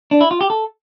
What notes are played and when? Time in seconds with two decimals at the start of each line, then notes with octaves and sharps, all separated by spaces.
0.11 D4
0.21 E4
0.31 F4
0.41 G4
0.50 A4